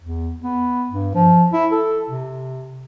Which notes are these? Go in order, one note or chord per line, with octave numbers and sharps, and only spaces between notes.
E2
B3
G2
F3
E4
A4
C3